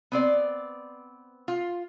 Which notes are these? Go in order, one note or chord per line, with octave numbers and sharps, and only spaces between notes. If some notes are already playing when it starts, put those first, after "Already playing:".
B3 C4 D5
F4